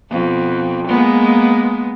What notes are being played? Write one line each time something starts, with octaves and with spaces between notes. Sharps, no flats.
F2 B2
G#3 A#3 B3